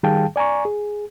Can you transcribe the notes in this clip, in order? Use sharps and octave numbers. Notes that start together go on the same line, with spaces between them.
D#3 G3 G#4 F5 G5 A5
D5 G#5 A#5 C#6
G#4